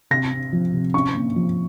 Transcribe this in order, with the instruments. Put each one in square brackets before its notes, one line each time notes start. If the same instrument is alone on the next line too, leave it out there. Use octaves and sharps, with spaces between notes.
[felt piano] C3 A#6
C4
F3
C3
C#4 C#6
A#3
F3